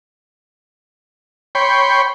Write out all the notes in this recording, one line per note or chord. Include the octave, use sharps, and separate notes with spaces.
C#5 G5 B5 C6